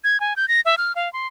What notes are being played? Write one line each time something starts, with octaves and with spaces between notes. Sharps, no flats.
G#6
G#5
G6
A#6
E5
F6
F5
C6